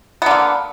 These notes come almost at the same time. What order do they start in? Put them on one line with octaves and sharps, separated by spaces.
B3 D3 A#3